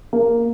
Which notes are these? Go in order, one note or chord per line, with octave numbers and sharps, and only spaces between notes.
A#3